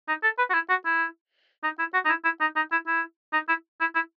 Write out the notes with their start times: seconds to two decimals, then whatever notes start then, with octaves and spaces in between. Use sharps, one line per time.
0.08 D#4
0.23 A4
0.38 B4
0.50 F#4
0.54 E4
0.69 F#4
0.86 E4
1.64 D#4
1.79 E4
1.94 F#4
2.05 D#4
2.09 E4
2.24 E4
2.41 D#4
2.56 D#4
2.72 E4
2.87 E4
3.33 D#4
3.48 E4
3.81 E4
3.95 E4